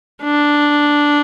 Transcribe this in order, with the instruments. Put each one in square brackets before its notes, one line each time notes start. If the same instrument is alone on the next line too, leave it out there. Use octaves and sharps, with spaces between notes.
[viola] D4